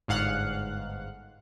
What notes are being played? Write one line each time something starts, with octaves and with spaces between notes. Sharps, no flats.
G1 G#2 F5 F#5 F#6